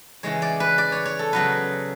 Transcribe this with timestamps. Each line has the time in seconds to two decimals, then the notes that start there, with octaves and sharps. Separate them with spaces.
0.23 C#3 E3 G#3 C#5
0.42 D5
0.60 B4
0.78 D5
0.92 C#5
1.06 C#5
1.19 A4
1.32 C#3 F#3 B3 B4